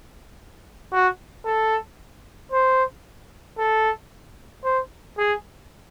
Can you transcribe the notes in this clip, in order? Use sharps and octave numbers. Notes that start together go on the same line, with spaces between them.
F#4
A4
C5
A4
C5
G#4